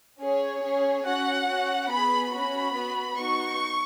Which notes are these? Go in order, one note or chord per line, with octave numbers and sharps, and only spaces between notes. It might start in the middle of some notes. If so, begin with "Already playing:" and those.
C#4 G#4 C#5
C#4 G#4
C#4 F#4 F#5
C#4 F#4
B3 G#4 B5
C#4 F#4 B5
B3 F#4
B3 D#4 F#4 C#6